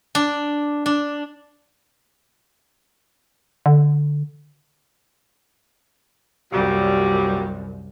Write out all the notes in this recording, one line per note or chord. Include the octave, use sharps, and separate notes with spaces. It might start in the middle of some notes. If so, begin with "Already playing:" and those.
D4
D4
D3
C2 F#2 A#2 F#3 G3